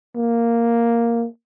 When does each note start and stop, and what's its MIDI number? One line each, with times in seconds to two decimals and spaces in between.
0.16 1.25 58